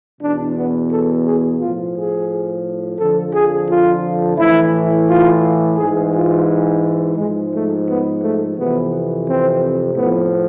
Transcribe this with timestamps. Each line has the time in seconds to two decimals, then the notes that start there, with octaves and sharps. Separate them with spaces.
0.19 E2 B2 D4
0.54 B3
0.88 A4
1.24 G#4
1.58 A2 F3 F4
1.93 G#4
2.97 F2 D3 F3 A4
3.32 G#4
3.67 F4
4.37 A2 E3 E4
5.07 F4
5.76 G#2 E3 G#4
6.12 F4
7.15 G#2 F3 G#3
7.51 A3
7.85 B3
8.20 A3
8.55 F2 C3 E3 B3
9.24 C4
9.94 A2 F3 B3